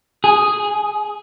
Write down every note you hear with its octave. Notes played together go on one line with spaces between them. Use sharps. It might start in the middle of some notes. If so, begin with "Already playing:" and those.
G#4